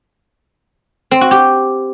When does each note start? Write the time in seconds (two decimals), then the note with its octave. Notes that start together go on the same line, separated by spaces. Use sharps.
1.11 C4
1.21 F#4
1.31 G4